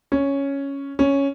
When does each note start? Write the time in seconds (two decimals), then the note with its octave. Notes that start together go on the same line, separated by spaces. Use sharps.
0.12 C#4
0.99 C#4